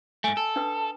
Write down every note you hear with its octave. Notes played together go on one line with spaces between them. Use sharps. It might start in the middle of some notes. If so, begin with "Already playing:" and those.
G#2 A3 G#5
A4
D4 B4 D#6